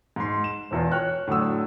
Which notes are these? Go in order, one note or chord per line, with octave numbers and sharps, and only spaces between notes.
G#2 C6
E7
E1 E2 F4
C#5 G5 F6 F#6
A2 D3 F#3 D#6 E6